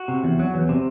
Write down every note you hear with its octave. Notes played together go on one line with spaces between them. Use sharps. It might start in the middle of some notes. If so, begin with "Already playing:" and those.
Already playing: F#4
C3
E2
F#3
E2
C3